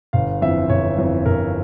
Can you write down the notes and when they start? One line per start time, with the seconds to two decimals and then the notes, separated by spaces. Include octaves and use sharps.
0.13 G1 F5
0.42 F2 E3 E5
0.69 G1 C#5
0.98 F2 E3
1.26 G1 A#4